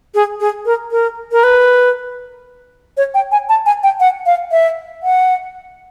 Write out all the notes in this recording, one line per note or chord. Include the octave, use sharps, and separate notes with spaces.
G#4
G#4
A#4
A#4
A#4
B4
C#5
G5
G#5
A5
G#5
G5
F#5
F5
E5
F#5